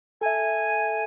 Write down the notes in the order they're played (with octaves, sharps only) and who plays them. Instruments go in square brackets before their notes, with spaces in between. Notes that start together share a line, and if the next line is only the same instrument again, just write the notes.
[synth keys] A4 E5 [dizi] G#5